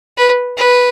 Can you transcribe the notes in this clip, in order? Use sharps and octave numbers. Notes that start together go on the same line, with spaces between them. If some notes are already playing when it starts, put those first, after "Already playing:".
B4
B4